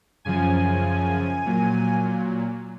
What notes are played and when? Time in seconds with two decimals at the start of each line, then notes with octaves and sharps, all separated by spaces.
0.25 F#2 C#3 F3 G#5
1.45 A#2 F#3